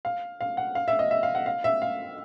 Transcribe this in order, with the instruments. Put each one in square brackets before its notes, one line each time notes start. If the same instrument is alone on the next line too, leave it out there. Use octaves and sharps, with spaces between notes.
[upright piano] F5
F5
F#5
F5
E5
D#5
E5
F5
F#5
F5
E5
F5